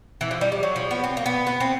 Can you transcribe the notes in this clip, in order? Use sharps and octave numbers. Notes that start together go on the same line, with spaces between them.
E3
F3
G3
G3
F#3
F3
B3
C4
A#3
B3
B3
C4